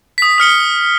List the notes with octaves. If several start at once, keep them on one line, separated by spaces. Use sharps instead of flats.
D#6 B6
D#6 F6 C#7 G7